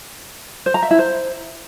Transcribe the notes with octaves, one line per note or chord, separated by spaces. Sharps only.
C5
A#5
E5
E4
C5